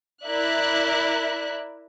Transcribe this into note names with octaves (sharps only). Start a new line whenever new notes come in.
E4 A#4 D5 E5 F#6